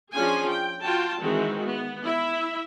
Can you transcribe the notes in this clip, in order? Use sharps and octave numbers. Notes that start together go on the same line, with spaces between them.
F3 C#4 D4 F4 G#4 G#5
G5
F4 F#4 G5 A5
D#3 E3 G#3 C4 F#4
B3
E4 E5